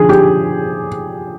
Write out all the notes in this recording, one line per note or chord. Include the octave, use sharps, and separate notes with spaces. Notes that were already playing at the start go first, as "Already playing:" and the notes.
Already playing: D3 F3 G#4
G4